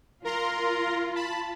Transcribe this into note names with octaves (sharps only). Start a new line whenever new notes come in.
F4 A#4 A#5 C6
A5 B5